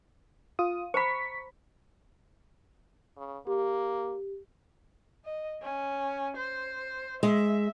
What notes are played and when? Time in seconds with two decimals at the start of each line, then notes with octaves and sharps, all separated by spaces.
0.59 F4 D#6
0.94 C5 A#5 B5 C#6 B6
3.17 C#3
3.47 A#3 G4
5.25 D#5
5.62 C#4
6.37 C5
7.23 G#3 E5